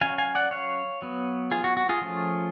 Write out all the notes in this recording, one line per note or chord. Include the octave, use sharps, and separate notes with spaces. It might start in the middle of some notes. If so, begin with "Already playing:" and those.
F#3 C#4 F5 G#5
F5 G#5
D5 F#5
C#5 F5
F#3 B3
F4 G#4
F#4
F#4
F4 G#4
F3 A3 C#4